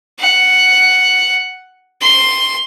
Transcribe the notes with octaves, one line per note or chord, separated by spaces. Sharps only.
F#5
C6